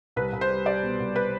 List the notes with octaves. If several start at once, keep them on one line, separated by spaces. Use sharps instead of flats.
C2 B4
C2
C5
G3
G3 D5
B2
C2
B4